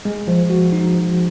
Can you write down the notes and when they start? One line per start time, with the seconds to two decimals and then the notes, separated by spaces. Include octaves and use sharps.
0.05 G#3
0.28 F3
0.50 F#4
0.72 D#4
0.94 F3